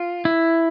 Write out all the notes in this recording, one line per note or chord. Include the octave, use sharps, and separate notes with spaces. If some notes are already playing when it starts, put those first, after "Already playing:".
Already playing: F4
E4